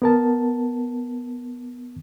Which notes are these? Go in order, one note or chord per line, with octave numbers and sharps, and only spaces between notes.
B3 A#4 A5